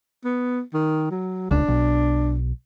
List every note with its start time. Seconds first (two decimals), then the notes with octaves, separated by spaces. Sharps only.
0.25 B3
0.74 D#3
1.11 F#3
1.51 D#1 C#2 D4
1.68 B1